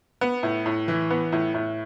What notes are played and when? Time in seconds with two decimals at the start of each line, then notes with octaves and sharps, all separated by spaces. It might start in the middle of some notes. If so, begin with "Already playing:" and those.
0.21 B3
0.43 A2
0.66 A2
0.88 E3
1.11 B3
1.32 A2
1.54 A2